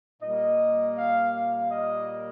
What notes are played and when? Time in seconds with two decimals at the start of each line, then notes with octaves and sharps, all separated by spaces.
0.21 A#2 G3 A#3 D#5
0.95 F5
1.33 F5
1.69 D#5